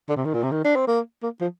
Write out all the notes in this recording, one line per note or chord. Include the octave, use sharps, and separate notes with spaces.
D3
C3
D#3
A#2
C3
D#3
D4
C4
A#3
A#3
F3